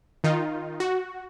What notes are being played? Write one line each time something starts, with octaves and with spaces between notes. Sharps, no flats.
D#3 D#4 F4
F#4